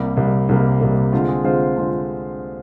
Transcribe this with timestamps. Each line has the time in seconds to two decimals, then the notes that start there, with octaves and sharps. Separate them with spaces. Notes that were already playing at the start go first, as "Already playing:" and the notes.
Already playing: C2 C3 G3 A#3 D5
0.17 C2 C3 G3 A#3
0.49 C2 C3 G3 A#3
0.80 C2 C3 G3 A#3
1.13 D3 G#3 C4 F4
1.28 G#4
1.44 D3 G#3 C4 F4 C5
1.76 D3 G#3 C4 F4